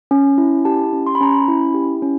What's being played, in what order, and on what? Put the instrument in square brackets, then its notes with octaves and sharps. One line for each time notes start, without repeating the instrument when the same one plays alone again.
[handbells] C#4
E4
G4 A5
C#4
C6
B5
C#4 A#5
B5
E4
G4
C#4